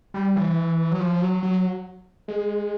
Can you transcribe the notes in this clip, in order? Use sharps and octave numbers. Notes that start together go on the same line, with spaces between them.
G3
E3
F#3
F3
F#3
F#3
G#3